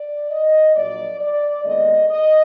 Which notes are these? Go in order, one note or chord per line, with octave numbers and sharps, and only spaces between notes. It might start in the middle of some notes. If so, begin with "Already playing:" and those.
Already playing: D5
D#5
A#1 A#2 F#3 A#3 D5
D5
D#2 D3 G#3 B3 D#5
D#5